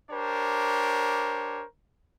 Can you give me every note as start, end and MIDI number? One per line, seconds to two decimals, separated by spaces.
0.11 1.63 62
0.11 1.63 67
0.11 1.63 70
0.11 1.63 72
0.11 1.63 73